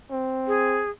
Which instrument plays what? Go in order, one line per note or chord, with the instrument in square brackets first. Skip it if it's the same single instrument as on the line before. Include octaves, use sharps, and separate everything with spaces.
[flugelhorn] C4
[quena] G#4